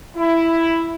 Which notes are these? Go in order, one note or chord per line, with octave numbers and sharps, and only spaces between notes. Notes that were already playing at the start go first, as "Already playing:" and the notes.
E4